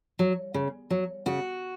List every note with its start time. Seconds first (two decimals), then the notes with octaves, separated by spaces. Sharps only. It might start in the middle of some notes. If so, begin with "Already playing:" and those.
0.19 F#3
0.54 C#3
0.90 F#3
1.26 C#3 F#4